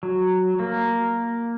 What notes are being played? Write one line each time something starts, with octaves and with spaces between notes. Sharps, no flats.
F#3
A#3